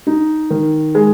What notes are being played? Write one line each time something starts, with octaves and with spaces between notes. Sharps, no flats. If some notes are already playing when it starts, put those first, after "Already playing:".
D#4
D#3
G#3